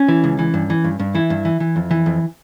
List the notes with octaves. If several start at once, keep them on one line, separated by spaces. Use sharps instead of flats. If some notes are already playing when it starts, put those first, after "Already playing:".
Already playing: C#4
E3
C#2
E3
G2
E3
G2
G2
E3 E4
G2
E3
E3
F2
E3
F2